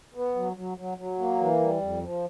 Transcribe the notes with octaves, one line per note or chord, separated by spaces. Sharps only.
B3
F#3
F#3
F#3
F#3
A#3
E3
G3
F2
F3